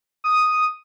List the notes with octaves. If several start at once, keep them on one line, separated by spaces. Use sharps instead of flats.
D#6